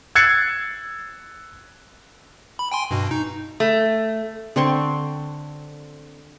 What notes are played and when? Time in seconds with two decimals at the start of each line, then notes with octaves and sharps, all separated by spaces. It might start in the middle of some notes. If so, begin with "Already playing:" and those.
0.15 E6 F#6 G#6 A6 C7 C#7
2.59 B5
2.72 G5 G#5 C6
2.91 G2 B2
3.11 D#4
3.60 A3
4.56 D3 C4 C6 C#6